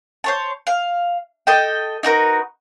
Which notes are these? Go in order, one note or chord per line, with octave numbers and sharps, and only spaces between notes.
C5 C#5 A5
F5
A4 D#5 G5
D#4 F#4 A#4 B4